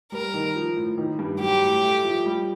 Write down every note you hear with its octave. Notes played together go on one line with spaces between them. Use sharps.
G3 A#4
D#3
F3
A2
D#3
G2
F#3 G4
A2
A3
F3
G3